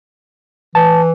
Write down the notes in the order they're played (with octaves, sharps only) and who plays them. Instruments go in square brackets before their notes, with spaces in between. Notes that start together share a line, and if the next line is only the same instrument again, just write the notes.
[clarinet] E3 [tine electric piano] A5